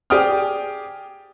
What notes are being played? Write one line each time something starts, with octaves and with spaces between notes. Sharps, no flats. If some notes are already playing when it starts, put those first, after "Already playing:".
G4 G#4 D5 G5 D#6 F6